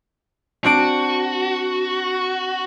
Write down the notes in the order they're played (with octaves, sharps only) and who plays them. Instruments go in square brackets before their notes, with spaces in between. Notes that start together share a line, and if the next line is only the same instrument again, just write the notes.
[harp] C4 D4 D7 [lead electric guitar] F#4